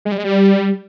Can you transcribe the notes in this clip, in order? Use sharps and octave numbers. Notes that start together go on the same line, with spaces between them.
G#3
G3
G#3
G3